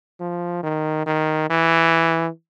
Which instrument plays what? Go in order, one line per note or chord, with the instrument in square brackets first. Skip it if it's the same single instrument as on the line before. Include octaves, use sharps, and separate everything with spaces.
[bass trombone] F3
D#3
D#3
E3